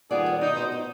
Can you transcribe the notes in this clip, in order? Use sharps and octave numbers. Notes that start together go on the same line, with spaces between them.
D#3 G3 B3 F4 G#4 D5
C5
B2 B3 D#4 D5
C5
C5